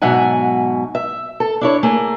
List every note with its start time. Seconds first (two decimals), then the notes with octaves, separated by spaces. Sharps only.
0.01 G#2 B2 F#3 E5 F#5 G#5
0.95 E5
1.40 A4
1.61 D4 E4 C#5
1.83 A3 A#3 G#4